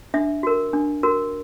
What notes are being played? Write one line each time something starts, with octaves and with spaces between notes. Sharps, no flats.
D4 E5
F#4 A#4
D4
F#4 A#4